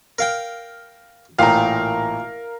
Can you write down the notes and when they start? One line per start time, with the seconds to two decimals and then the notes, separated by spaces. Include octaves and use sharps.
0.19 A#4 F5 G5
1.39 A1 A#2 A#4 F5 G5